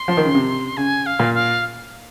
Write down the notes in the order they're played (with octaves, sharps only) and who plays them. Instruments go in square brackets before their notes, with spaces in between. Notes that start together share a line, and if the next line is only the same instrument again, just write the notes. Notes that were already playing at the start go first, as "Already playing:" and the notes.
Already playing: [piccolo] C6
[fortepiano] F3
D#3
C#3
C3
[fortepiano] C#3 [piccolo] G#5
[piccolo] F5
[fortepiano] A#2
[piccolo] F5